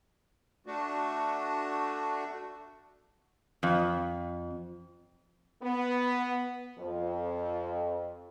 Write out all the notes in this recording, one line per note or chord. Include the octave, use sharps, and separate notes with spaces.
A3 D4 F#4
F2
B3
F2